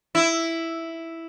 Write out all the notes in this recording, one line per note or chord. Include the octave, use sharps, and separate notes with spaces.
E4